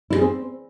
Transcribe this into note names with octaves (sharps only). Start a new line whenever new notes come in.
E4
G#4
C4